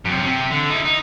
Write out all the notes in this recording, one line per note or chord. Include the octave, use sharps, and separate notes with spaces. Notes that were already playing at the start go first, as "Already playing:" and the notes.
F#2 C3
C3
D3
D#4 E4
D#4